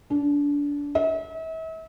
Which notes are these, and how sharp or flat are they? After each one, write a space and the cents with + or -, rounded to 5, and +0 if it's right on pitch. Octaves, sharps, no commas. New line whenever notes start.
D4 -25
E5 -40